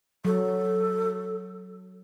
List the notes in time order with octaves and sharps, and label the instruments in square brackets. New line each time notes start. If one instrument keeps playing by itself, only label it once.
[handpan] F#3 [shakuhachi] A4